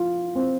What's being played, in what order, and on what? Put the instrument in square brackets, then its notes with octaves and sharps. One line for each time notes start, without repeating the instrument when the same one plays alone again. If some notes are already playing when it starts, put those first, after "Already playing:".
Already playing: [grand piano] F3 F4
C4